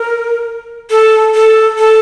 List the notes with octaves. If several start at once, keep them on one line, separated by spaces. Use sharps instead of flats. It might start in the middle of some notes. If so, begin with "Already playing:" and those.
Already playing: A#4
A4
A4
A4